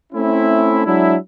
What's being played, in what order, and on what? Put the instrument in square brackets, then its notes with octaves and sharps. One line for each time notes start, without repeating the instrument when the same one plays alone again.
[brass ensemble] A3 C4 C#4 E4
F#3 G#3 D4 E4